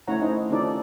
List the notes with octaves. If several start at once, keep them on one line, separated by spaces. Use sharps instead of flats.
A3 C#4 E4 C#5 F#5 A#5
D#4 A4 C5 D#5
C4 C#4 D#4 F4 A4 D5